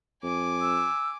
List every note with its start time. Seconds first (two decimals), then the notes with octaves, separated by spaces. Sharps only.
0.23 F2 G#5 D6
0.61 E6